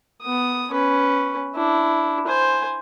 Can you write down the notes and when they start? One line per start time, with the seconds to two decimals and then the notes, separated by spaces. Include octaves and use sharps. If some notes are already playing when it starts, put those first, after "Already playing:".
0.22 B3 D#6
0.71 C#4 B4
1.55 D4 E4
2.27 C5 G#5